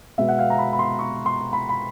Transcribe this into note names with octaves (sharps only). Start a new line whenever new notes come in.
B2 G#3 B3 E5
F#5
F5
A#5
B5
B5
C6
C#6
C6
B5
B5